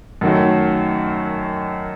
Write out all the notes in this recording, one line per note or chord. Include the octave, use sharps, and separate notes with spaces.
F#2 D#3 F#3 A3